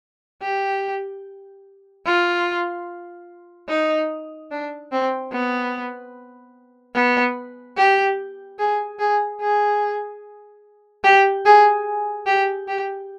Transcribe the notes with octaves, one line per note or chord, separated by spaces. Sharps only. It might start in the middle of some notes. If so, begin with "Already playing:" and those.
G4
F4
D#4
D4
C4
B3
B3
G4
G#4
G#4
G#4
G4
G#4
G4
G4